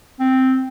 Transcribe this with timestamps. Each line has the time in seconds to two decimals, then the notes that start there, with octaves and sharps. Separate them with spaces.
0.20 C4